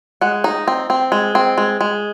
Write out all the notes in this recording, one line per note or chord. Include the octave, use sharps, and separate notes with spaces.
G#3 F#5
D#4
C4
C4
G#3
C4
G#3
G#3